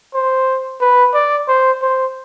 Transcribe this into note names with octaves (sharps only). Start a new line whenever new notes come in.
C5
B4
D5
C5
C5